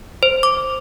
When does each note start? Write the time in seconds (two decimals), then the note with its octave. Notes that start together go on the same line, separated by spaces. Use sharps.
0.23 C5
0.43 D6